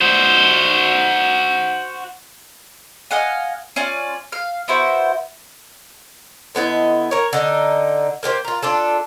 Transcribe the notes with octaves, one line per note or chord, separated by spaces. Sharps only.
F#4 C5
D#5 F5 F#5 G#5
C#4 F4 D5
F5
B3 E4 F#4 C5
D3 B3 E4 D#5
A#4 C#5
D3 D#4
A#3 G4 B4 C5
F4 A#4
D4 F4 A4